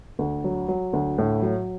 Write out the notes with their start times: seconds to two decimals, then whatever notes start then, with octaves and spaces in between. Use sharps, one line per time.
0.19 D2
0.44 F#3
0.68 F#3
0.93 D2
1.18 A2
1.42 F#3